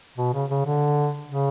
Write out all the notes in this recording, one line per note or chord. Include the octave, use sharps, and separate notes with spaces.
B2
C#3
C#3
D3
C#3